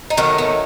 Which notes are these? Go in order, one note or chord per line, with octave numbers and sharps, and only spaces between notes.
D#4
D#3 F#3 A3 C#4
B3